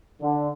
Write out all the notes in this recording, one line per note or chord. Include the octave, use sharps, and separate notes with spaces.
D3